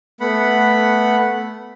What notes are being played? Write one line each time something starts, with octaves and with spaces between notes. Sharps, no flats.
A3 B3 F#5 B5